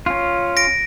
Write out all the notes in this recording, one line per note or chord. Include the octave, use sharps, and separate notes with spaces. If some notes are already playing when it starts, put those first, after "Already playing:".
C#4 F4
A#6 D7